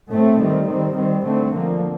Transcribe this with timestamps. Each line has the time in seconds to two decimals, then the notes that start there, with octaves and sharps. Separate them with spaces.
0.11 A2 A3 C4
0.39 D#3 G3 C4
0.67 D#3 G3 C4
0.96 D#3 G3 C4
1.24 D3 A3 C4
1.53 D3 F3 A#3